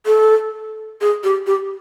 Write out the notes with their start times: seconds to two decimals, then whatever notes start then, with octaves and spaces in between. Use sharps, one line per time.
0.06 A4
1.01 G#4
1.24 G4
1.47 G4